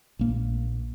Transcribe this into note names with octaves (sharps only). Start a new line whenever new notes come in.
A#1 A#3